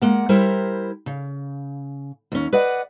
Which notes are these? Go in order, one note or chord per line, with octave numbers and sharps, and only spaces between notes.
G#3 A#3 F#5
G3 E4 A#4 C5
C#3
D#2 C#4
B4 D5 D#5 F#5